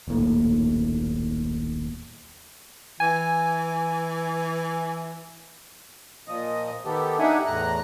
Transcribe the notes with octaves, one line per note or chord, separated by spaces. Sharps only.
D#1 B1 A2 A#3
E3 G#5
A#2 F3 D#5
D#3 B3 G4 A4
D4 D#4 G4 E5 F#5 G#5
E2 A2 A#5 F#6